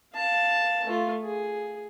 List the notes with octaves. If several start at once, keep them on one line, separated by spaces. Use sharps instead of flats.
F5 A5
A3 F4
G#4